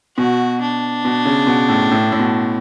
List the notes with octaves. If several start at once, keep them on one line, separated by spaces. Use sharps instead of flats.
B2 F#4
D4
B2
C#3
B2
A2
A2
A2
B2